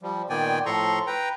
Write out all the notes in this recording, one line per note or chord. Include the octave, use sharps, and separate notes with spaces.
F3 G3
A#2 D#3 B3 D5 G5 G#5
A2 F3 A4 A#5 C6 C#6
B4 G5 A#5